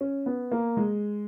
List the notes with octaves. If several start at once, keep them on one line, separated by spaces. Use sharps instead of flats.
C#4
B3
A#3
G#3